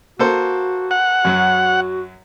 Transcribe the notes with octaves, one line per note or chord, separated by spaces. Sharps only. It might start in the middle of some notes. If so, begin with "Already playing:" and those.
A#3 F#4 A4 C5
F#5
F#2 F#3 F#4